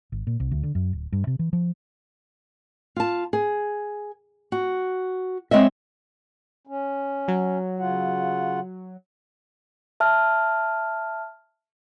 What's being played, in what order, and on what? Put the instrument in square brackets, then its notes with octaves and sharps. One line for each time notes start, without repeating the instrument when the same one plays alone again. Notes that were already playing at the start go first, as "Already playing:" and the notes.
[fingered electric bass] G#1
A#2
C2
D2
D3
F#2
D1
G2
C3
E3
F3
[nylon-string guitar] F4 A5
G#4
F#4
G#3 C4 C#5 D#5 E5
[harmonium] C#4
[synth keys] F#3
[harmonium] C#3 F4 F#5
[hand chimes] E5 A5 F6